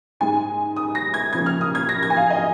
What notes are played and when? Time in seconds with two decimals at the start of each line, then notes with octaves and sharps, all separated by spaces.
0.20 G#2 G#3 G#5
0.76 D#6
0.95 A#6
1.14 G#6
1.33 C#3 F3 A#3 G#6
1.46 F6
1.61 D#6
1.75 G#6
1.89 A#6
2.03 G#6
2.10 G#5
2.16 F5
2.30 D#5